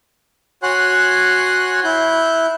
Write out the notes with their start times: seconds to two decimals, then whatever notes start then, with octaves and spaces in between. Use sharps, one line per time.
0.63 F#4 C#5 F#5 G#5 C6 F#6
1.84 E4 F#6 G6